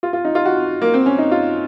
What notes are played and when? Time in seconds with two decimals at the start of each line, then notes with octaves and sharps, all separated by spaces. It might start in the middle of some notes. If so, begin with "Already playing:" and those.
0.03 F4
0.13 F4
0.25 D#4
0.35 F4
0.45 F#4
0.82 A#3
0.94 C4
1.06 C#4
1.18 D#4
1.31 F4